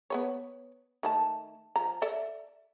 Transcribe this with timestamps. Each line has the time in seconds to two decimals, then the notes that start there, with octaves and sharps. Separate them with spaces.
0.10 B3 B4 C#5
1.03 D#3 A3 A5
1.76 F3 A#5
2.02 A4 D5 E5